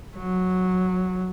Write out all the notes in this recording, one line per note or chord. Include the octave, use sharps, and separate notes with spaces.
F#3